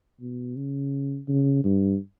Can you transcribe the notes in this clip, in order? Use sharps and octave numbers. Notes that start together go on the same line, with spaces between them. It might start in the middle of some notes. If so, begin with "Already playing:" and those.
B2
C#3
C#3
G2